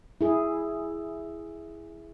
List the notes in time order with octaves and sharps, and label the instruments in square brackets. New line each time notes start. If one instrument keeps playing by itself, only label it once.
[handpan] E4 G#4